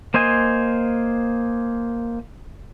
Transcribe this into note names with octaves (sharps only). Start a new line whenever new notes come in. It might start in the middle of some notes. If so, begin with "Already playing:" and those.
A#3 C5 D#5 G#5